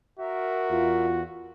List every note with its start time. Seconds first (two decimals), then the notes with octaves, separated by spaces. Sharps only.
0.19 F#4 A#4 E5
0.70 E2 F4